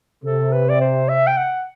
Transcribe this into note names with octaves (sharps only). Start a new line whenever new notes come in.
C3 A4
B4
D5
C5
E5
G5
F#5